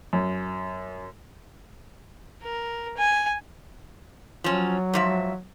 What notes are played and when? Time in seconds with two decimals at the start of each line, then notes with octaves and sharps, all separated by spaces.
0.13 F#2
2.43 A#4
2.97 G#5
4.44 F3 F#3 C#4
4.94 G#2 F3 E5